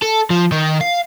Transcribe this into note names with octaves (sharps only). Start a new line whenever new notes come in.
A4
F3
D#3
F5